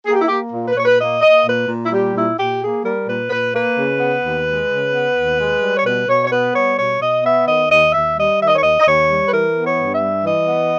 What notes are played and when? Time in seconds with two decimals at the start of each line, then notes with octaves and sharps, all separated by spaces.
0.06 A#3 G#4
0.13 G4
0.21 E4
0.28 A#3 G4
0.53 A#2
0.68 B4
0.75 A#2 C#5
0.85 B4
0.98 A#3 D#5
1.21 A#3 D#5
1.45 A#2 B4
1.68 A#2
1.86 E4
1.91 G3 G4
2.14 A#2 E4
2.37 A#2 G4
2.60 A#3 G#4
2.83 G3 A#4
3.06 A#2 B4
3.30 A#2 B4
3.53 A#3 B4
3.77 C#3
4.00 B3
4.23 D#2
4.46 G#3
4.68 C#3
4.92 B3
5.16 D#2
5.38 G#3
5.61 G3
5.77 C#5
5.84 B2 B4
6.07 B2 C#5
6.24 C#5
6.30 B3 B4
6.54 G3 C#5
6.77 B2 C#5
7.00 B2 D#5
7.24 B3 E5
7.46 D#3 D#5
7.69 D#2 D#5
7.92 D#2 E5
8.16 G3 D#5
8.39 D#3 E5
8.47 D#5
8.55 C#5
8.62 D#2 D#5
8.80 D#5
8.85 D#2 C#5
9.09 G3
9.28 B4
9.32 E3 A#4
9.55 B3
9.63 C#5
9.79 G2
9.93 E5
10.01 G3
10.24 E3 D#5
10.47 B3